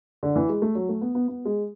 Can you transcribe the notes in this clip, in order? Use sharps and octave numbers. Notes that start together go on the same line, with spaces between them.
D3
E3
G#3
A3
F#3
A3
B3
B3
B3
G#3